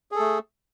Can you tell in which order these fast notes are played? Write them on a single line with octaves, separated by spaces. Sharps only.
G#4 A4 A3